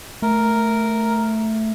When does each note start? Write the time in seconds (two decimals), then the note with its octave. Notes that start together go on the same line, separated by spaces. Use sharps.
0.22 A3 A#4